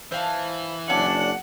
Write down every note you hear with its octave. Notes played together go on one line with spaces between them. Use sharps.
E3 C5 F5 A5
F#1 C#4 D4 F#5